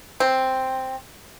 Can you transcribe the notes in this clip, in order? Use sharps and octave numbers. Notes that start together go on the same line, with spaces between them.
C4